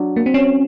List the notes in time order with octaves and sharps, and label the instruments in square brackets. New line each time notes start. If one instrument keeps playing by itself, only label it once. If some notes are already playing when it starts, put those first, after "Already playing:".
Already playing: [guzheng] F#3 D4
[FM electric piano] A#3
C4
C#4